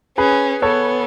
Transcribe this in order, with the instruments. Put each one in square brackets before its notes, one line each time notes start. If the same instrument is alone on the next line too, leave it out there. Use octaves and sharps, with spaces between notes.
[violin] C#4 [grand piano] G#4 B4
[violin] B3 [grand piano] A4 C#5